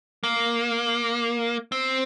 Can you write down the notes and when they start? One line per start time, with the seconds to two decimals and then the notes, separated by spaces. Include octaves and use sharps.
0.24 A#3
1.72 C4